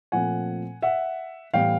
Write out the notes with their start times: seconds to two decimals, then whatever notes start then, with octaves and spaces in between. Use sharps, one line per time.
0.12 A#2 F3 A3 C4 F#5 G#5
0.82 E5 F#5
1.54 A2 E3 G3 B3 F5 G5